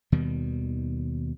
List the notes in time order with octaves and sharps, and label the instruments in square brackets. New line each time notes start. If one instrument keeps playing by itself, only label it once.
[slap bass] D#2 B2 D#3 G3